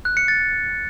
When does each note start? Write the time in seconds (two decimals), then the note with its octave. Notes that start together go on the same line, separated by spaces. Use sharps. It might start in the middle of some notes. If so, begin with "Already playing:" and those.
0.05 F#6
0.17 C#7
0.28 A6